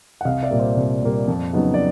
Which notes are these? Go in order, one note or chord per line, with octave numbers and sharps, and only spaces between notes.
F#5
C2 D#5 F5
D5 E5
A#2 G3 A#3
C5 D5
C2
A#2 G3 A#3
F2
C#3 F#3 B3 D#4
D5